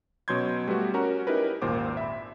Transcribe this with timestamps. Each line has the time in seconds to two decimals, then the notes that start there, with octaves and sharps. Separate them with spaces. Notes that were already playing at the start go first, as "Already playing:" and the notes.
0.28 B2 F#3 C#4 C6 G6 G#6
0.68 G3 A3 B3 F#4 G4
0.94 C#4 F#4 A#4 A#5
1.27 C#4 D#4 E4 G4 A#4 B4
1.62 G#1 D#2 A#2 C5 D6
1.97 E5 B5